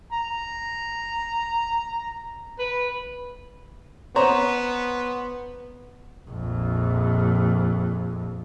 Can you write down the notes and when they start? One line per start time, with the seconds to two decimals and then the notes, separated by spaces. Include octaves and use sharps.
0.12 A#5
2.59 B4
4.16 B3 C5 C#5 A#5
6.29 A#1 F2